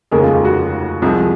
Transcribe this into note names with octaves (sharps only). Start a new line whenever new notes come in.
F1 D#2 C#3 G#3 A#4
F4
F4
F#4
C2 C3 F3 G#3